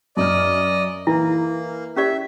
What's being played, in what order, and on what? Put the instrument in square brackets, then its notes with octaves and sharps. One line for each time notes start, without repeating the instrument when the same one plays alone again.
[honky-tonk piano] F#2 F6 [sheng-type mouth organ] D5 D#5
[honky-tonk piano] E3 [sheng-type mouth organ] A#3 [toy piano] E4
[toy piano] C#4 G4 D5 [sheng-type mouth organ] E5